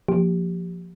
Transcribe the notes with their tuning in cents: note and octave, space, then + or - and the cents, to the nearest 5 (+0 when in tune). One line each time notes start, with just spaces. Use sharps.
F3 +10 A#3 +0 G4 +0